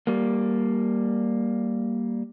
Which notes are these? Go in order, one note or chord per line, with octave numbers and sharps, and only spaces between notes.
G3 A#3